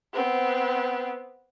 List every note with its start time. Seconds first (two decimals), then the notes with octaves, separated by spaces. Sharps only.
0.13 B3 C4